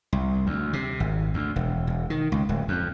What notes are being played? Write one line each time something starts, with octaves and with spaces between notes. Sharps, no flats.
C2
D2
C3
G#1
D2
E1
E1
D#3
C#2
D1
F2